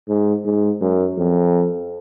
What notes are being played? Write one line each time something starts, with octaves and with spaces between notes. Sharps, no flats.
G#2
G#2
F#2
F2